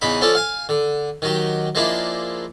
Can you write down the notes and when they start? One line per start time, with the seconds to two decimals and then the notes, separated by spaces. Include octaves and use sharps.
0.02 E2 C#3 D#4 B5
0.21 F3 C#4 A4 D5
0.35 F5 G#5
0.69 D3
1.22 D#3 F#3 G4
1.75 F3 G#3 A#3 D4 E4